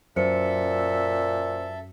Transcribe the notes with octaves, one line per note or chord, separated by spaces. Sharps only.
F#2 A#2 A4 C5 E5 C#7